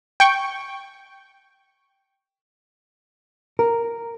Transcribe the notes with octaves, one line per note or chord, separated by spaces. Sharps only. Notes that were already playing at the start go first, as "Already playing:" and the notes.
G5 C#6
A#4